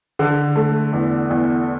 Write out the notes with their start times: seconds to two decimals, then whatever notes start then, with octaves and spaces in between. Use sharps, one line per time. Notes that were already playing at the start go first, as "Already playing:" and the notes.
0.19 D3
0.56 A3
0.93 E2
1.30 E2